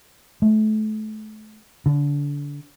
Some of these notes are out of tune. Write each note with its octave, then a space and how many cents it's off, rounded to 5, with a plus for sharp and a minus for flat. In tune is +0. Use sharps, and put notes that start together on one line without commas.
A3 -30
D3 -30